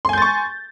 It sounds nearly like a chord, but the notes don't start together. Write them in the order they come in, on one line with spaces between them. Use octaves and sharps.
C6 G#5 G6 A6 C#6